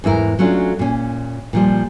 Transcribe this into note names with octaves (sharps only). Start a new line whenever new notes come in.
E2 G#2 E4 A#4
F#3 A3 C#4 D4 F4
A#2 C#4
A#2 F3 G3